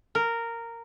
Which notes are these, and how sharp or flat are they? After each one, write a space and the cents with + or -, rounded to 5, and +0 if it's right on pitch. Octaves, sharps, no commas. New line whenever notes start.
A#4 -10